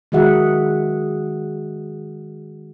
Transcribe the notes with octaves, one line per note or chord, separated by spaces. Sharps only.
D#3 G#3 F#4 G#4 E5 F#5